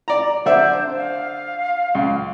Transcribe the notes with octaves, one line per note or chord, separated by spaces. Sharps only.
D5 A#5
D3 D4 C5 E5
F5
C#2